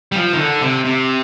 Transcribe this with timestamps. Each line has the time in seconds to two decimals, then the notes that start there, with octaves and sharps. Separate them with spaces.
0.12 G3
0.16 F3
0.33 D#3
0.39 D3
0.62 C3
0.85 C3